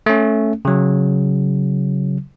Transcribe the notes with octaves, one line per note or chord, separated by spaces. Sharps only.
A3 C#4
C#3 F#3